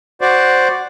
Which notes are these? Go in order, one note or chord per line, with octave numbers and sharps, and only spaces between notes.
F#4 C5 D5